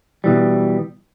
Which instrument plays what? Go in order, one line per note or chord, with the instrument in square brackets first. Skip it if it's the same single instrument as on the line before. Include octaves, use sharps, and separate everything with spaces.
[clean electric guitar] B2 E3 G3